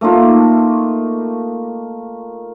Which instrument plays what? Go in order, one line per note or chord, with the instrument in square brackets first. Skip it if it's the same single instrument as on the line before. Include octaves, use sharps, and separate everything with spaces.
[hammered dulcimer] A3 A#3 D#4 F4